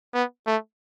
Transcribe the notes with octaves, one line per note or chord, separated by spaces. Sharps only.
B3
A3